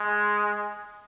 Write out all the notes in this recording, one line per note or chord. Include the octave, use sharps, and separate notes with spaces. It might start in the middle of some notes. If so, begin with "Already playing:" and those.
Already playing: G#3